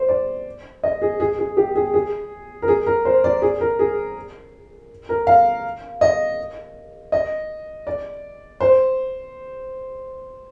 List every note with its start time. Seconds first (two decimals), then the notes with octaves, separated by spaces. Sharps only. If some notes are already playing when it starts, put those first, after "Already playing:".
Already playing: C5
0.09 D5
0.83 D#5
1.02 G#4
1.20 G#4
1.39 G#4
1.57 G4
1.75 G#4
1.94 G#4
2.62 A#4
2.68 G#4
2.86 A#4
3.05 C5
3.24 D5
3.42 G#4
3.61 A#4
3.79 G#4
5.09 A#4
5.27 F5
6.01 D#5
7.12 D#5
7.87 D5
8.60 C5